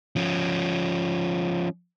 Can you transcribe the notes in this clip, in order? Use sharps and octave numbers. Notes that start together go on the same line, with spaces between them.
F3 C#4